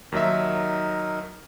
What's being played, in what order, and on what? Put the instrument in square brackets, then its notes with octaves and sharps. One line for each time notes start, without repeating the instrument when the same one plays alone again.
[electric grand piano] D#2 F#3 E5 [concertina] D#4 A#4